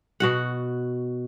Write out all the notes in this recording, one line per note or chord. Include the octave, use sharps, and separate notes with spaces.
B2 F#4 F#5